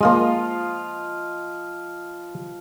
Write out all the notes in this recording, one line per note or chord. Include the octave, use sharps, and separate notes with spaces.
F3 G#3 A#3 F4 D#5